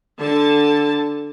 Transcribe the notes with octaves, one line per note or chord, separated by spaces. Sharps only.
D3 A5